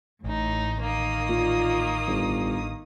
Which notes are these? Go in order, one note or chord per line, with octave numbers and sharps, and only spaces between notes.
A1 A2 D#4
D#3 A#3 D#6
A#2
G1